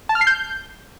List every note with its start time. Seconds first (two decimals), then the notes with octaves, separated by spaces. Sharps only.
0.09 A5
0.15 F6
0.21 C7
0.27 G6